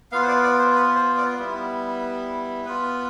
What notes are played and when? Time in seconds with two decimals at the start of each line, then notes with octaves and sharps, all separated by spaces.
0.12 B3 F4 F5
0.23 C5
0.28 D5
0.43 D5
0.59 C5
0.75 B4
0.95 C5
1.17 D5
1.38 G3 B3 E4
2.65 B3 F4 B4